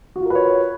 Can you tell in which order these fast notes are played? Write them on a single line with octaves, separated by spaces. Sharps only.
F#4 F4 A#4 B4 C#5